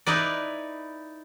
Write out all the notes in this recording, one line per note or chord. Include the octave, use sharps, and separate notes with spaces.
D#4 E4 B4 D5